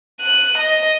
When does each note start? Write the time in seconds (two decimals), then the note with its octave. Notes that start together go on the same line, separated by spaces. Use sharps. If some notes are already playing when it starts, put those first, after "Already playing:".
0.21 F#6 D#7
0.58 D#5